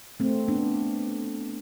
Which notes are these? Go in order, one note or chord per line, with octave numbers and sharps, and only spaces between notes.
A3 C4
B3 D4